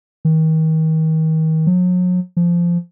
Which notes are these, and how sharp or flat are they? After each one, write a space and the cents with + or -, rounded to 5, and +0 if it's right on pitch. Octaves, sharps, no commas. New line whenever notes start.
D#3 +35
F#3 -40
F3 -15